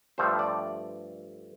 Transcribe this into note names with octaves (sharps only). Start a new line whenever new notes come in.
G2 D3 F3 A3 C5
D5